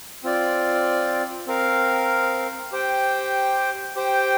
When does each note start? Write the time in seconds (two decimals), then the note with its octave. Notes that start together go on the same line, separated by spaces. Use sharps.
0.24 C4 F4 D5
1.47 C4 A#4 F5
2.72 G4 C5 G5
3.96 G4 C5 G5